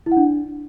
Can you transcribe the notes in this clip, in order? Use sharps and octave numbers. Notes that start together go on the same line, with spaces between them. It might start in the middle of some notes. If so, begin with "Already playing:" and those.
E4
F#5
D4